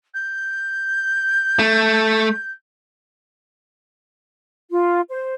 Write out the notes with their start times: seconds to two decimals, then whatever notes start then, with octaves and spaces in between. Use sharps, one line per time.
0.14 G6
1.59 A3
4.71 F4
5.10 C5